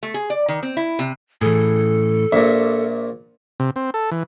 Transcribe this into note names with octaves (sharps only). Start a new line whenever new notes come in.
A3
G#4
D5
D#3
C4
E4
C3
A2 E3 G#4 A4
A#1 A#2 E5
C3
C4
A4
E3